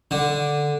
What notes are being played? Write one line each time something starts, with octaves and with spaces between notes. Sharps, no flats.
D3